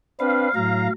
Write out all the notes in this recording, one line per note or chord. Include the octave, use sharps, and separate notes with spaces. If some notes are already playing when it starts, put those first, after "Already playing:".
C4 D4 B4 F5
A2 F#3 A#5